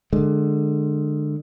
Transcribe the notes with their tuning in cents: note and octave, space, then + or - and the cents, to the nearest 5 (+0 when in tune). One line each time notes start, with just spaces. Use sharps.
D3 +25 G#3 +20